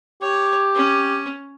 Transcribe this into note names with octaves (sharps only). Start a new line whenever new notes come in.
G4 C#5
C#4